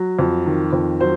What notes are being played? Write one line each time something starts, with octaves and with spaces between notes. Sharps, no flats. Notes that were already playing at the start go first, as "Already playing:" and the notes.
Already playing: F#3
F2
D#3
F2
F#3 C5